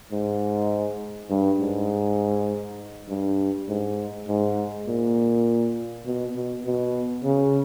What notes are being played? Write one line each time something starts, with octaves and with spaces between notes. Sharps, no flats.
G#2
G2
G#2
G2
G#2
G#2
A#2
B2
B2
B2
C#3